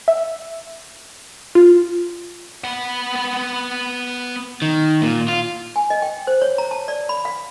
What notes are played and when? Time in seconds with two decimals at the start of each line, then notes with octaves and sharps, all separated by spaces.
0.08 E5
1.55 F4
2.64 B3 F#5
4.62 D#3
5.02 A#2
5.28 F4
5.76 G#5
5.90 D#5
6.02 G5
6.27 C5
6.42 C#5
6.58 A#5
6.71 A5
6.88 D5
7.09 B5
7.25 F5